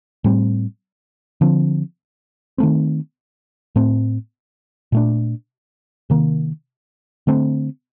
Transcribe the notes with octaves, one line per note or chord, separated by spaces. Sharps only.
A2 G3 C4
D3 F3 C4
D#3 A3 C4
A2 A3 C4
A#2 A3 D4
C3 D#3 A#3
D3 A3 C4